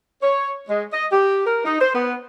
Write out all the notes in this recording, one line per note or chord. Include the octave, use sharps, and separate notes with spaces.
C#5
G#3
D#5
G4
A#4
D#4
C5
B3